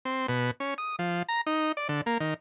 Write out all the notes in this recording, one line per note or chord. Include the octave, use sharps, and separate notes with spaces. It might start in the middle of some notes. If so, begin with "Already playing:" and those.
C4
B2
C#4
D#6
F3
A#5
D#4
D5
D3
A#3
D#3